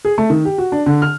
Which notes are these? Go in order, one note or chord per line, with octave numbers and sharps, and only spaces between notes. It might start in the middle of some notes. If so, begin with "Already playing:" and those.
G#4
A3
D#3
G4
F#4
D4
D3
F6